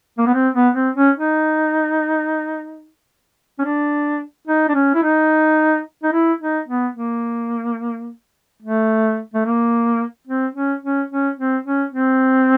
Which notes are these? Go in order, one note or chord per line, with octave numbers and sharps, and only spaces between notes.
A#3
B3
C4
B3
C4
C#4
D#4
C#4
D4
D#4
D4
C#4
E4
D#4
D#4
E4
D#4
B3
A#3
A3
A3
A#3
C4
C#4
C#4
C#4
C4
C#4
C4